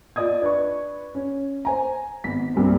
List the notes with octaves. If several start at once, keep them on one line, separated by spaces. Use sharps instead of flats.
F4 D5 D#5 D#6 G#6
D4 B4 C#6
C#4
C5 G#5 A#5
G#1 B3 B6
C2 G2 A#3 C4